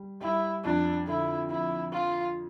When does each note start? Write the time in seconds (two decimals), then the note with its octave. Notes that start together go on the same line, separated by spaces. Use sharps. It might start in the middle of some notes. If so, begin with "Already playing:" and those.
Already playing: G3
0.21 G3 E4
0.65 F2 D4
1.07 D3 E4
1.50 F3 E4
1.92 F3 F4